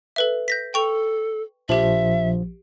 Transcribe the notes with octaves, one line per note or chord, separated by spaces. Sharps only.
A4 B4 E5
G6 A#6 B6
A4 G5 C#6 F7
A#1 F3 G4 E5 F#7